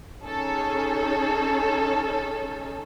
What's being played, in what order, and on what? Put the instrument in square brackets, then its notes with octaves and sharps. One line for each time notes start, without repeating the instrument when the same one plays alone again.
[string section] C#4 D#4 G#4 A4 C#5